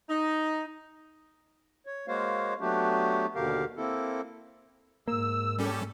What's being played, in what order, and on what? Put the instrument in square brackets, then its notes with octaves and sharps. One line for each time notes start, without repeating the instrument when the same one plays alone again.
[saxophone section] D#4
[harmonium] C#5
G#3 A#3 F#4 C5 C#5 F5
F#3 A3 B3 D4 F#4 G4
D#2 B2 D3 G4 A#4 F5
A#3 C4 E4 A4
[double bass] G#2 [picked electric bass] A#3 [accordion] E6
[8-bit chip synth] G3 C#4 A4 [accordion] G4